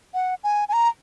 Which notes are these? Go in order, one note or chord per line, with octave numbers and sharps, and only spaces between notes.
F#5
G#5
G#5
A#5